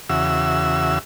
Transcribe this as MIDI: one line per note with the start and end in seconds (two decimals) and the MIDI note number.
0.10 0.99 40
0.10 0.99 49
0.10 0.99 66
0.10 0.99 76
0.10 0.99 88